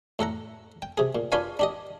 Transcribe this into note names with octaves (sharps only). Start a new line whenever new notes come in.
A2 A4 F#5 A#5
G5
C3 G#4
A#2
D4 F4 B4 C#5 F5 G#5
D4 G4 D#5